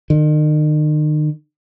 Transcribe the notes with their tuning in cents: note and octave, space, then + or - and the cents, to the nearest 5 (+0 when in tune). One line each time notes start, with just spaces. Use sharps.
D#3 -40